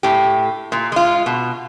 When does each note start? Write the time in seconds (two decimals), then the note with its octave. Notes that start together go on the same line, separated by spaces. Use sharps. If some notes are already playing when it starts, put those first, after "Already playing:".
0.03 A2 G4
0.72 A#2
0.92 G#3 F4
1.26 B2